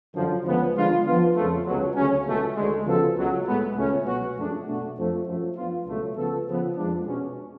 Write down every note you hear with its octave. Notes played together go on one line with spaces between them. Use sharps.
F#2 D3 F3
D2 C#3 F3 G#3 B3
D3 F3 G#3 D4 F4
F3 B3 F4
F2 C#3 F3 A3 F4
C#2 B2 F#3
D2 C#3 F#3 C#4
C#2 B2 A3
D2 D3 G#3
C#3 F3 B3 F#4 A4
C#2 B2 F#3
A2 G#3 B3
C#2 B2 A3 C#4
B2 F#3 B3 F#4
F#2 F3 A3 D4 G#4
B2 A3 D4 F#4
F2 F3 A3
F#2 F3 A3
F3 B3 D4 F4
C#2 B2 F#3 A3
C#3 F3 B3 F4 A4
C#3 F3 B3
F2 F3 G#3 D4
B2 G#3 C#4